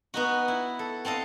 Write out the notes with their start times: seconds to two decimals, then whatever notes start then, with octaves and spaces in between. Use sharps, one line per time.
0.14 B3 D#4 F#4
0.48 E4
0.79 A4
1.05 C4 A4 D#5 F5